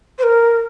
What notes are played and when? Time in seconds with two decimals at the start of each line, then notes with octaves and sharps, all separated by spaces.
0.19 C5
0.23 A#4